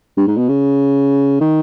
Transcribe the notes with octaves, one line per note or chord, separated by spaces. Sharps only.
G2
G#2
B2
C#3
D#3